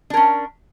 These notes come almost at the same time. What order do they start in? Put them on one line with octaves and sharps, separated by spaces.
D4 A#4 C#4